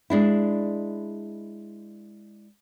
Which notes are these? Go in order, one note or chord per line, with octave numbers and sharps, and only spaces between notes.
G#3 D4 E4